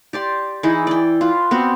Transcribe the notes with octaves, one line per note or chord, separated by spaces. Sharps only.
G4 D5 C6
E3 D#4 E4 G#4
D5 G5
F4 B4
B3 C4 F#4